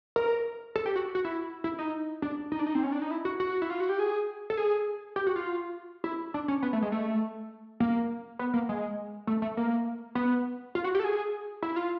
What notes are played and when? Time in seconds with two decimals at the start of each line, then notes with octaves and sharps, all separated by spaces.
0.16 A#4
0.76 A4
0.86 G4
0.96 F#4
1.15 F#4
1.25 E4
1.64 E4
1.79 D#4
2.22 D4
2.52 D#4
2.59 D4
2.66 D#4
2.75 C4
2.83 C#4
2.92 D4
3.02 D#4
3.11 E4
3.25 F#4
3.40 F#4
3.62 E4
3.70 F4
3.80 F#4
3.89 G4
3.99 G#4
4.50 A4
4.57 G#4
5.16 G4
5.27 F#4
5.36 F4
6.04 E4
6.34 D4
6.48 C#4
6.63 B3
6.73 A3
6.82 G#3
6.92 A3
7.80 A#3
8.39 B3
8.54 A#3
8.69 G#3
9.27 A3
9.42 A3
9.57 A#3
10.15 B3
10.75 F4
10.84 F#4
10.95 G4
11.00 A4
11.04 G#4
11.63 E4
11.76 F4